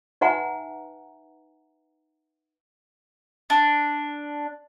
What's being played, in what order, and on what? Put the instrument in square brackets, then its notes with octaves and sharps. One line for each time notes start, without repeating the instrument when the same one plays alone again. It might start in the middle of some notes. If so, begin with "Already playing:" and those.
[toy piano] D#4 B4 E5 F#5 G#5 A#5
[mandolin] D4